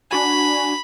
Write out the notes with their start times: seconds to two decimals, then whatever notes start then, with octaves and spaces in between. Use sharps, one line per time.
0.11 D4 F#4 G#5 B5